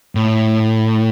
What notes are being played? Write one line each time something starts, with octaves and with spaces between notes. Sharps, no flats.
A2